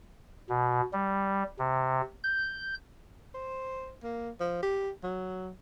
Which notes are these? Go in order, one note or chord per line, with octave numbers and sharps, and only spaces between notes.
B2
G3
C3
G6
C5
A#3
F3
G4
F#3